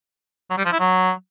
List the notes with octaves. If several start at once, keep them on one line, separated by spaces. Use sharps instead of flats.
F#3
G3
F3
E4
F#3